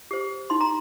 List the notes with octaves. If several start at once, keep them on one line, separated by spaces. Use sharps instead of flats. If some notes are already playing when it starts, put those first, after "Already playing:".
G4 C5
D#4 C6
A#5